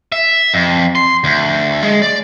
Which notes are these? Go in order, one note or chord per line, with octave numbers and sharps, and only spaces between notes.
E5
F2
C6
D2
G#3
D5